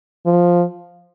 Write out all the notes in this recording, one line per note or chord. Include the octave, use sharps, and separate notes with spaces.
F3